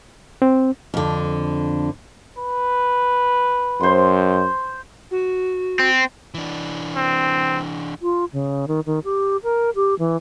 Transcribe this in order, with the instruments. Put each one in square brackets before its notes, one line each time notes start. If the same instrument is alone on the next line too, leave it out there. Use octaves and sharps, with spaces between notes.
[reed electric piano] C4
[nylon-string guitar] F2 D3
[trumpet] B4
[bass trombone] F#2 [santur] C5 C6
[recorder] F#4
[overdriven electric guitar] C4
[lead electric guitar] E3 D4
[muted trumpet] C4
[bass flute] F4
C#3
D#3
D#3
G4
A#4
G4
E3